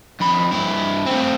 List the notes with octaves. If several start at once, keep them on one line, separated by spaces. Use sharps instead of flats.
F2 B5
G2 E4
A3 C4